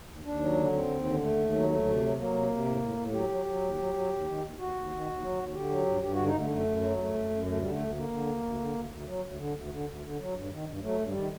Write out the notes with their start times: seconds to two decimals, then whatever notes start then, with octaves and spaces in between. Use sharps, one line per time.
0.09 D#2
0.25 D#2 D4
0.41 F#3
0.58 D3
0.73 D#2 C4
0.89 D#2
1.05 D3
1.21 D#2 A3
1.37 D#2
1.52 F#3
1.69 D2 A3
1.86 C3
2.01 F#3
2.17 F#3 A#3
2.33 C3
2.49 C3
2.66 A2
2.81 A2
2.97 A2
3.13 F#3 G4
3.29 F#3
3.46 F#3
3.61 D#2
3.78 F#3
3.94 F#3
4.10 D#2
4.25 D#3
4.42 D#2
4.58 D#2 F#4
4.74 D#2
4.90 D#3
5.06 D#2
5.21 F#3
5.37 D#2
5.53 D3 G4
5.69 F#3
5.86 G2
6.01 G2 G4
6.13 D3 F#4
6.26 D#4
6.33 D3 A3
6.49 F#2 A3
6.66 F#2
6.81 F#3
6.97 F#2 A3
7.14 F#2
7.30 F#2
7.45 D2 A3
7.58 D3 G3
7.70 A3
7.78 D2
7.94 D3 A#3
8.09 D3
8.25 D2
8.42 D2
8.58 D3
8.74 D2
8.90 D2
9.06 F#3
9.22 D2
9.38 D3
9.54 D2
9.70 D3
9.86 D2
10.02 D3
10.19 F#3
10.35 G2
10.50 D#3
10.66 G2
10.82 F#3 A3
10.98 G2
11.06 G3
11.14 D#3